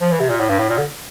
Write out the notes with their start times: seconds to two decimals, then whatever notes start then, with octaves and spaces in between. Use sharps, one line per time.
0.01 F3
0.11 E3
0.20 C3
0.30 A#2
0.40 A2
0.49 G2
0.59 A2
0.69 A#2
0.78 D3